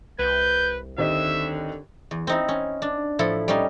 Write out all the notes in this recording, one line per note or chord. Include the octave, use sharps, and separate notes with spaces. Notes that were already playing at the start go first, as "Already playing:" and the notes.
C2 B4 G6
D#2 D3 C4 D#5 E5
E2
C4 D#4 E4
C#4
D4
A2 F3 E4 A4
G3 C#4 D#4